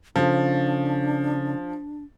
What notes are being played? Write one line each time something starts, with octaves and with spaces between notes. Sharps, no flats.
C#3 F3 D4 A4